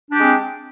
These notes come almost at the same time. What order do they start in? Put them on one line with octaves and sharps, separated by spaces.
D4 G4 G#3 C4